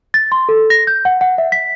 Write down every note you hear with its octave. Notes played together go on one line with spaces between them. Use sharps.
A6
C6
A4
A#6
G6
F#5
F#5
E5
B6